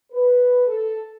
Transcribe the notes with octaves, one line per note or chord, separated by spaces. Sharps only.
B4
A4